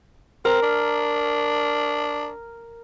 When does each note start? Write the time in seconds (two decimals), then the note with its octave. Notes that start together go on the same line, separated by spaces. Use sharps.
0.45 C4 A#4
0.62 D4